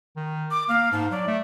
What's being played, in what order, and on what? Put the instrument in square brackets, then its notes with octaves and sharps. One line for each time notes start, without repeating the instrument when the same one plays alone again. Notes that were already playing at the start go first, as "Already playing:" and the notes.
[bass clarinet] D#3
[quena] D6
[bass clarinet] A#3 [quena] F5
[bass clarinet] G#2 [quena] A5
[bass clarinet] F#3 [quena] D5
[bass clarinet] A3